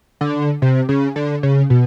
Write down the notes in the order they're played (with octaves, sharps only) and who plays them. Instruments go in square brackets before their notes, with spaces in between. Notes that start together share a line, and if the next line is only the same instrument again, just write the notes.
[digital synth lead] D3
C3
C#3
D3
C#3
B2